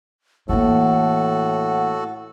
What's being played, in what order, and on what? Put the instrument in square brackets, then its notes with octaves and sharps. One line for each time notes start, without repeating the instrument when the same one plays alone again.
[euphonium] A2 [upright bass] E3 A#3 [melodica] F#4 A4 [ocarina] F#5